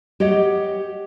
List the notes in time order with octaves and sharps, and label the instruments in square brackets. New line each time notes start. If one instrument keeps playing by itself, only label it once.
[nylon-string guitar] G4 C#5 D#5 F#5